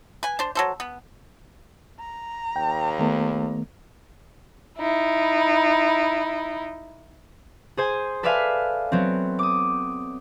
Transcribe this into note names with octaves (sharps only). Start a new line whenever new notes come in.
B4 G#5
D4 C5
F#3 A4 C5
B3
A#5
D#2 G5
D#3 A3 B3
D#4 E4
G#4 C5 G#5
A4 B4 D5 E5 F5 G#5
F#3 B3 C4
D6 D#6